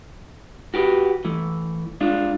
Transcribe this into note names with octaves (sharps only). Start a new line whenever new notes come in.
F#4 G4 B4
E3 A3
G#3 D4 F4